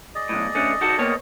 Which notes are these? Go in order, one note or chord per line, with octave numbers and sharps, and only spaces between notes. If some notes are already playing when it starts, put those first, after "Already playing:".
G#4 D5 D#5
B1 A2
D3 A3 C#4
D#4 F#4 A4
A#3 B3 C#5